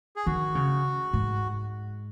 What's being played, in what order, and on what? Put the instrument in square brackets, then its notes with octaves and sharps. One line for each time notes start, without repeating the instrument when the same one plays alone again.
[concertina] G#4
[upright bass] D#3 [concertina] F#4
[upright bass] C#3
G#2